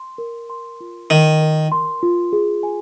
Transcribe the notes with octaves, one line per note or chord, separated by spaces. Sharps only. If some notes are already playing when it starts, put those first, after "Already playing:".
Already playing: C6
A#4
C6
F4
D#3 A#4
A#4
C6
F4
G#4
G#5